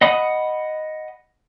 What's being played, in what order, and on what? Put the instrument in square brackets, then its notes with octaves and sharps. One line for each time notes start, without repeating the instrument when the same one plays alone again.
[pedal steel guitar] D#5 F#5 B5 D#6